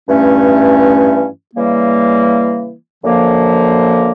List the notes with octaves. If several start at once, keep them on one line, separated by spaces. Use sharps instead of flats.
G2 E3 A3 C#4
C#3 E3 G3 A#3
F#2 D3 F3 A#3